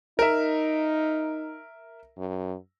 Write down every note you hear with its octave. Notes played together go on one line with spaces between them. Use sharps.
D#4 A#4 E5
F#2